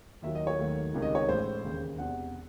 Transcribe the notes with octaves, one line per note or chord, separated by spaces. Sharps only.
D#2 D#3 F#3 E5
D#5
C#5
D#2 D#3 F#3 A3
C#2 C3 D#3 G#3
D#5
C#5
A1 A2 G#3 C5
E1 D#2 C#3
E1 E2 C3 F#5